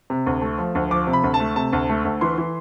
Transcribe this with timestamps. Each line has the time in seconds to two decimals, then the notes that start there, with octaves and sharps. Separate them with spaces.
0.10 C3
0.26 D2
0.42 A3
0.58 F3
0.75 D2
0.91 F3 D6
1.07 C3
1.13 B5
1.23 D2
1.34 A5
1.40 A3
1.56 C3 A5
1.73 D2
1.89 A3
2.05 D2
2.21 E3 C6
2.38 E3